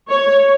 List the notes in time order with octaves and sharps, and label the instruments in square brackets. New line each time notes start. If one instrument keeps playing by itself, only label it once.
[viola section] C#5